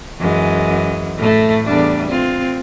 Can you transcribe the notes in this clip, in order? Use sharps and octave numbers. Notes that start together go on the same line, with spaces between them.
F#2 E3 G#3
A2 A3
E2 G3 D4
C4 F4